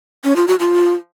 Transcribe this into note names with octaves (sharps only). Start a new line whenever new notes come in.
C#4
F4
F#4
F4